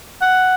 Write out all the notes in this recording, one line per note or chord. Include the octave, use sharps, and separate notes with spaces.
F#5